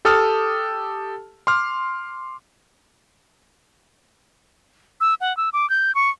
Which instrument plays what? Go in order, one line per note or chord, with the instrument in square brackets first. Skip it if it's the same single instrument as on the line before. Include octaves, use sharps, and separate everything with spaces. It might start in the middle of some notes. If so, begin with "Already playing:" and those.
[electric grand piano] G4 A4 A5 D#6 F6
C6 D6 F6
[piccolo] E6
F#5
E6
D6
G6
C#6